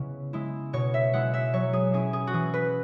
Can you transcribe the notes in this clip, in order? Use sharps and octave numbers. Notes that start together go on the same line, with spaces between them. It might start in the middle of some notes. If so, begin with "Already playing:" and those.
Already playing: C#3 G#3 B3 E4
G#3 E4
B2 C#5
E5
G#3 E4 F#5
E5
F#3 C#5
G#4
C#4 E4 G#4
G#4
F#4
E3 G#4
B4